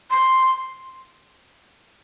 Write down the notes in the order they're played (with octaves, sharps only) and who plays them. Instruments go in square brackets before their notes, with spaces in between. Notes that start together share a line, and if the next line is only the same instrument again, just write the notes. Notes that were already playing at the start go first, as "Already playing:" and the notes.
[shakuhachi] C6